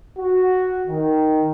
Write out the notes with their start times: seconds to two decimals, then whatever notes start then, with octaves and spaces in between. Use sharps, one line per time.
0.18 F#4
0.88 D#3